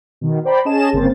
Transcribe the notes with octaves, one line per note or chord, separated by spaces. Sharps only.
B2 D#3
C5 D5 G5 A#5 B5
C#4 G#4 D#5 A5 E7
G1 C#3 A#3 C4 C5 A6